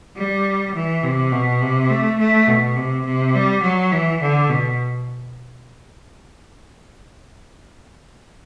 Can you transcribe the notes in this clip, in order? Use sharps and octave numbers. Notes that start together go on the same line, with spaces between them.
G3
E3
C3
B2
C3
A3
A3
B2
C3
C3
G3
F#3
E3
D3
B2